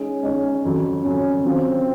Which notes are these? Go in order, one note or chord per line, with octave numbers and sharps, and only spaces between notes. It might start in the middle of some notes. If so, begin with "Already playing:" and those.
Already playing: G#3 C#4 D#4 G#4
G#3 D#4 G#4 C#5
F2 C#3 F#3
F2 C#3 F#3 C#4
F#3 C4 C#4 F4